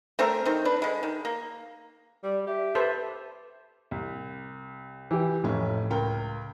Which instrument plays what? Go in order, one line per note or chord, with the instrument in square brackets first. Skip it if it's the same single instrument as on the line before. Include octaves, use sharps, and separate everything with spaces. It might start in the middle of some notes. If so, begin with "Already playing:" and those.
[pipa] A3 C4 D4 A#4
D#3 C4
D4 B4
D3 G#3
D#3
A#3
[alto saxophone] G3 [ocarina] D5
[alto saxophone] G4 [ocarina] E5
[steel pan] A4 B4 C5
[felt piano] C2
[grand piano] E3 G4
[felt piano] F1 C#4 [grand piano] A2
[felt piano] C#2 A#4 G5